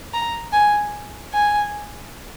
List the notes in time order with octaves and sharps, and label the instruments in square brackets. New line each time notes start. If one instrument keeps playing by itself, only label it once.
[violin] A#5
G#5
G#5